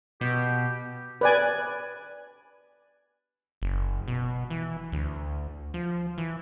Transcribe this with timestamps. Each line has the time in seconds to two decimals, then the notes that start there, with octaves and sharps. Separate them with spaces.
0.21 B2 G4
1.21 B4 D5 G#5
3.62 F#1
4.08 B2
4.50 E3
4.92 D2
5.74 F3
6.18 E3